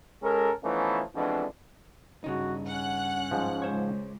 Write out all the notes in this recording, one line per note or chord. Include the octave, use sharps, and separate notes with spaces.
G#3 C#4 A4 A#4
E3 F3 A3 B3 C#4 D#4
F2 B2 E3 G#3 D4
G2 C#3 D#4 F#4
C#4 F#5 F#6
G#2 F3
C#2 C5 C#5